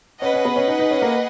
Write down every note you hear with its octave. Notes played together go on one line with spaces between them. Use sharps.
C#4 G#4 B4 D#5 F#5
C#4
B3
C#4
D#4
D#4
C#4
A#3